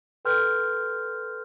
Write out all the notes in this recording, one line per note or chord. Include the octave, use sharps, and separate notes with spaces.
A4 B4 G5 C6 F6 G6